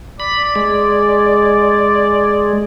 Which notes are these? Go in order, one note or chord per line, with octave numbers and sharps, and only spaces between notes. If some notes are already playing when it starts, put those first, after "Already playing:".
D5 B5
G#3